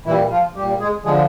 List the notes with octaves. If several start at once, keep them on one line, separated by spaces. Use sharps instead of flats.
A#2 E3 G3 E4
F3 F4
A#2 G3 G4
G#3 G#4
D3 F3 G#3 G#4